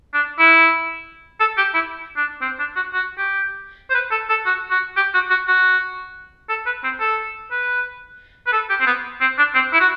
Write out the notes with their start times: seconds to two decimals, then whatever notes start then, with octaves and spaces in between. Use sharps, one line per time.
0.13 D4
0.39 E4
1.40 A4
1.57 G4
1.74 E4
2.16 D4
2.42 C4
2.59 D4
2.76 F#4
2.93 F#4
3.18 G4
3.90 C5
3.94 B4
4.11 A4
4.29 A4
4.46 F#4
4.70 F#4
4.96 G4
5.14 F#4
5.30 F#4
5.48 F#4
6.49 A4
6.66 B4
6.84 C4
7.00 A4
7.51 B4
8.46 B4
8.53 A4
8.70 G4
8.80 C4
8.86 B3
9.21 C4
9.38 D4
9.54 C4
9.73 E4
9.80 F#4